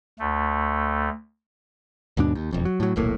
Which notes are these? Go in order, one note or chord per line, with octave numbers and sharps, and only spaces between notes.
D2 A3
D#2 G#2 B2 D4
D#2
E1 F2
F#3
A2 F#3
D#1 B1 A2 A#3